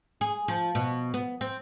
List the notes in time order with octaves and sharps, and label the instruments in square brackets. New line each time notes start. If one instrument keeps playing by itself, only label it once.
[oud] G#4
F3
B2
B3
C4